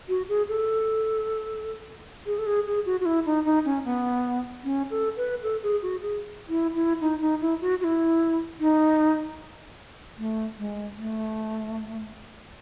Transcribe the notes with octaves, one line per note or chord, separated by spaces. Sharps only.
F#4
G#4
A4
G#4
A4
G#4
G#4
F#4
F#4
E4
D#4
D#4
C#4
B3
C#4
A4
B4
A4
G#4
F#4
G#4
E4
E4
D#4
D#4
E4
F#4
F#4
E4
D#4
A3
G#3
A3